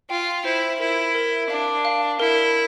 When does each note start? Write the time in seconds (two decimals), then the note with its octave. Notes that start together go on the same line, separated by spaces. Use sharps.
0.10 F4 G5
0.45 E4 C5
0.80 E4 A#4
1.15 A#4
1.50 D4 F5
1.85 F5
2.19 E4 A#4